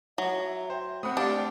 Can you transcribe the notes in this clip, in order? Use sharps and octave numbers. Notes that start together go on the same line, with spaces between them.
F#3 E5
C5 G5
A3 C4 F#5 B5 D#6
D4 G4 D5 F5